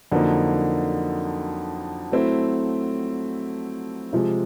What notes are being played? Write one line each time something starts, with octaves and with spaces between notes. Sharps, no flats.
F2 D3 F#3 A#3 D#4
F#3 A3 C4 E4
C3 F3 G#3